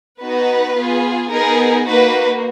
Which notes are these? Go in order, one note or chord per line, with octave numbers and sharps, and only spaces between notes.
B3 D#4 F#4 B4
B3 F4 G#4
B3 D#4 G#4 A#4
A#3 D#4 F#4 B4